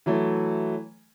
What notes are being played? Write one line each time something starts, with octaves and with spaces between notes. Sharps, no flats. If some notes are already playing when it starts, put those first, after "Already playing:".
E3 F#3 A3